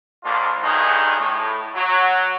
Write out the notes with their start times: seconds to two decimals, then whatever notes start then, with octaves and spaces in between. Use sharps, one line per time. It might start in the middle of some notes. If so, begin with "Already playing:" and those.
0.24 A#1 F2 A#3 D4 F4
0.63 B1 G2 D#3 E3 D#4 G#4
1.17 A2
1.75 F#3